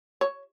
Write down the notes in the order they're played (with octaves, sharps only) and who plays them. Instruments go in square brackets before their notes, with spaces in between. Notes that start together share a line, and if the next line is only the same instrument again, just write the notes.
[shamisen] C#5